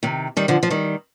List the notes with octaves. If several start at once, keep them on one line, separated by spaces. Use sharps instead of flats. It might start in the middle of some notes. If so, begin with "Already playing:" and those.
C3 D#3
D#3 G3
D3 F3
F3
D#3 G3